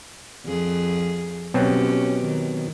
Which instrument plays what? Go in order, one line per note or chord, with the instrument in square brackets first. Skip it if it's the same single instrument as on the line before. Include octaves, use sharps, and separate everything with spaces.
[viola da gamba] F2 G#4
[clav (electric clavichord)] B2 F#3 C4 [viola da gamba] C#4 G4
[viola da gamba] D#3